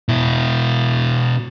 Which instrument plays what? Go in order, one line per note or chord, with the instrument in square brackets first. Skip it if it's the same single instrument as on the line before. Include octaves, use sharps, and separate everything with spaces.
[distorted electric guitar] B2 E4